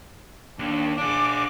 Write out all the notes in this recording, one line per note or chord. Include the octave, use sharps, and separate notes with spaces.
D#2 D4
D4 G#4 D6